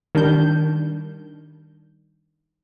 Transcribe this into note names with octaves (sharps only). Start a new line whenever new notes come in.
D#3 G3 D4 G6